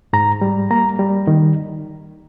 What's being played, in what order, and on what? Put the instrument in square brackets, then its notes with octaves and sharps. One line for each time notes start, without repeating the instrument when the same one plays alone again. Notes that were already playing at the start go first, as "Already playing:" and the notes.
[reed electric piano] G#2 A#5
G3
A#3 A#5
G3
D#3